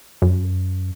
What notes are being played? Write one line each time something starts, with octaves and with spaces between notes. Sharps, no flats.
F#2